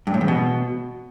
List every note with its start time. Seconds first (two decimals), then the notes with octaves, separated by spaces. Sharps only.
0.07 G2
0.14 A2
0.21 E2
0.28 B2